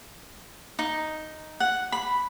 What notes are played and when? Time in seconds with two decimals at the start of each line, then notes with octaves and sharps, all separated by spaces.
0.79 D#4
1.60 F#5
1.92 B5